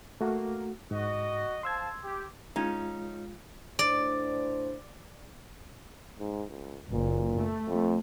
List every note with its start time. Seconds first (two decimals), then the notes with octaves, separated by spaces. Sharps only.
0.21 A3 A#3 F#4
0.91 G#2 F#4 D#5
1.63 C5 F5 A5 C6 E6 G#6
2.03 G4
2.56 G#3 C#4 D#4 F4 F5
3.79 A2 D4 C5 D5
6.20 G#2
6.50 C#2
6.93 F#1 A#2
7.38 A3
7.68 F2